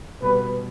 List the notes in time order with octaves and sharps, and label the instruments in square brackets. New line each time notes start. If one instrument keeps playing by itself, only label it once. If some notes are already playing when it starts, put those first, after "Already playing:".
[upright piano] B2 G3 B3 [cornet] B4